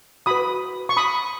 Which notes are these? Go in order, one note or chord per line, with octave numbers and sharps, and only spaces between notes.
F#4 B4 B5 D#6
C#6
B5 D#6